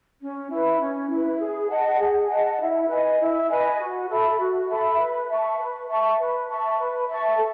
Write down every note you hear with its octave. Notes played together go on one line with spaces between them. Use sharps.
C#4
E4 B4
C#4
E4 B4
G#4
D#5 F#5 A5
G#4
D#5 F#5 A5
E4
B4 D#5 G#5
E4
B4 D#5 G#5
F#4
A4 E5 B5
F#4
A4 E5 B5
B4
E5 A5 C#6
B4
E5 A5 C#6
B4
E5 A5 C#6
B4
E5 A5 C#6
A4